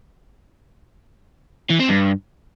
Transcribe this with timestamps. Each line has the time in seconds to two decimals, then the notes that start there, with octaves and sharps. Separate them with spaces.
1.70 E3
1.80 C4
1.89 G2